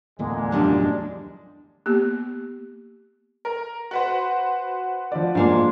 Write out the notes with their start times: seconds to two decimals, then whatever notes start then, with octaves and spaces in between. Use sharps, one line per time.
0.19 D1 E2 A#2 D3 G#3 A3
0.52 F#2 F3 G3 D4
1.86 A#3 B3 G4
3.45 A#4
3.91 F#4 B4 C5
5.12 F3 D5
5.35 G#2 G#3 A#3 D4 F4